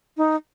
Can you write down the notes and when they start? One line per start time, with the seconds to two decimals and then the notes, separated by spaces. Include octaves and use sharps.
0.17 D#4